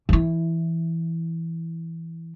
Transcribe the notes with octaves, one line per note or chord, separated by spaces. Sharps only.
E3 E4